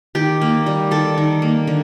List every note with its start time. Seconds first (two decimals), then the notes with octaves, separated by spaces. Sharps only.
0.15 D#3 G4
0.41 A#3
0.66 G3
0.91 D#3 A4
1.18 D#3
1.42 A#3
1.67 D3